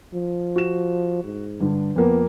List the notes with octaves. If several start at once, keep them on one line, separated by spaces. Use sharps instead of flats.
F3
F#4 E7
G#2
G2 D3
F2 A#3 B3 A#4